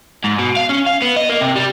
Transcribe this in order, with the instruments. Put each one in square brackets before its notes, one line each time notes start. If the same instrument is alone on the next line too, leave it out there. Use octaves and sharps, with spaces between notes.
[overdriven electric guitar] G#2
B2
F5
C#4
F5
B3
D#5
A#3
C3
G3